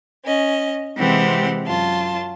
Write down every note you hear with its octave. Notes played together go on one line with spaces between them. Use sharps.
C#4 D#5
C3 E3 G#3 C4 G4 F#5
F#2 F4 A5